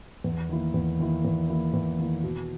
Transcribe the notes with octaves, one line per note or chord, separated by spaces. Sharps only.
E2
D#3 A#3 E4
E2
D#3 A#3 E4
E2
D#3 A#3 E4
E2
D#3 A#3 E4
B2